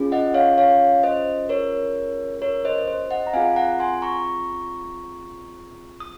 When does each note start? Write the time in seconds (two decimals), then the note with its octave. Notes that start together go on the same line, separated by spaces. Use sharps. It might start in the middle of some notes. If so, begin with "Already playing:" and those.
Already playing: C#4 F4 G#4
0.12 D#5 F#5
0.34 C#5 F5
0.58 C#5 F5
1.03 C5 D#5
1.49 A#4 C#5
2.42 A#4 C#5
2.65 C5 D#5
2.88 C5
3.11 D#5 F#5
3.27 A#5
3.33 C4 F4 G#4 F5 G#5
3.56 F#5 A#5
3.80 G#5 C6
4.02 A#5 C#6
6.00 D#6